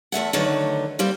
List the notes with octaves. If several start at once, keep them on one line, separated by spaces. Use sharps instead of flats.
E2 A3 E5 F#5
D3 D#3 F#3 A3 B4
G3 A#3 C4 B4